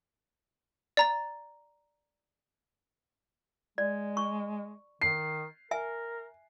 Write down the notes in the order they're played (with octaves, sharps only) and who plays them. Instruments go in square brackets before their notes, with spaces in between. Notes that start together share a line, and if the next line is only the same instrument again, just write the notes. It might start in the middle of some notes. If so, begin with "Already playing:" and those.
[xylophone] D5 A#5 A6
[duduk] G#3 [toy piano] D5
[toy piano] C#6
[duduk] D#3 [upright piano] C7
[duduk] A#4 [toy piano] E5 G#5